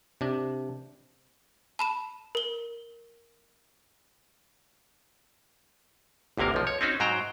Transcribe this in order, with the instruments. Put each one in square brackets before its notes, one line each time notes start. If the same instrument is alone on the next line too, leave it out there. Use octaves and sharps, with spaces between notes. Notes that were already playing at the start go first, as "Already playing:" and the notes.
[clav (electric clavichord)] C3 D4
[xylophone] A5 B5 E7
A#4 G7
[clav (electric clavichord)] G1 D2 C3 A#3 A#4
B1 F3
C#5
C4 C#4 D#4 F#4
G#2 F#3 C5 G5 A#5